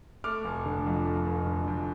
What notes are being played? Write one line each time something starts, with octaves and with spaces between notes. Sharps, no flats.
A3 D6 F6
F1
D3
F2
A3
F1
D3
F2